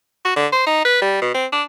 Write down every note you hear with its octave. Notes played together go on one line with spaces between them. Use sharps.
F#4
D3
C5
D#4
B4
G3
B2
C4
D4